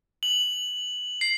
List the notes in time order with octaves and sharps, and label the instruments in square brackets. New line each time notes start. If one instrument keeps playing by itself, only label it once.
[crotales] F#7
C7